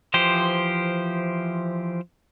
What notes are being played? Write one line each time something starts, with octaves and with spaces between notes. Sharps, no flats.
E3 F3 G4 C5